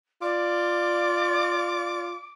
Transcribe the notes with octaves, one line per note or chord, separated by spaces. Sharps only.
F4 D5 D6